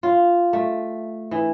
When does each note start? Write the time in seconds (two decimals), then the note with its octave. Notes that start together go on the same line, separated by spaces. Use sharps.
0.03 F4
0.53 A3
1.31 E3